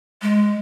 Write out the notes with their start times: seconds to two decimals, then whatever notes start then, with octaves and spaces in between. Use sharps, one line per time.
0.22 G#3